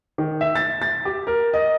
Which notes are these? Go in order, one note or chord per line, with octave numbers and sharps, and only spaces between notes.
D#3
E5
A6
A6
G4
A#4
D#5